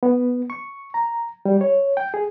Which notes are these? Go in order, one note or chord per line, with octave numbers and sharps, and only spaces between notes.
B3
C#6
A#5
G3
C#5
G5
G#4